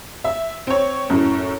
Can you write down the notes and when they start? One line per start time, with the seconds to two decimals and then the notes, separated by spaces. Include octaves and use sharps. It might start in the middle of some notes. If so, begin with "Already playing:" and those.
0.24 E5
0.67 C4 C#5
1.10 F#2 A2